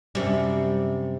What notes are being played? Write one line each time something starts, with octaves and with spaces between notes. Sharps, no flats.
F#2 C3 G3